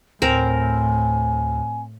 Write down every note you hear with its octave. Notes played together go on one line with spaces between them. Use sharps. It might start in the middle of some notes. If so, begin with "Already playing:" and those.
D2 A2 C4 A#4 G#5